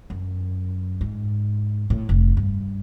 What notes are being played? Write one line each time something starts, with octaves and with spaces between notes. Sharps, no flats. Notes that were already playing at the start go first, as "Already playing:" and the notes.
F#2
G#2
A2
F1
G2